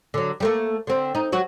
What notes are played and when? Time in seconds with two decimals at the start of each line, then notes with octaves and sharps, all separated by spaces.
0.14 D3 F#3
0.40 G3 A3 A#3
0.87 D3 C4
1.15 D#4
1.32 F#3 F#4